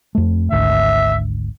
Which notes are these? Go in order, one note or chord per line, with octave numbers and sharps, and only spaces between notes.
F2 A3
G#1 D2 E5